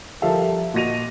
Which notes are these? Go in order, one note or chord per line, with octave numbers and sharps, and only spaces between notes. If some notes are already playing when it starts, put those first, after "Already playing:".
F3 G3 A4 A#4 E5 F5
A#2 F#4 D#5 A#6 D#7 F7